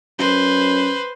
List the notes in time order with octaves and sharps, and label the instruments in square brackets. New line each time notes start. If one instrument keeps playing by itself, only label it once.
[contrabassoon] F#2 [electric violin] B4 C5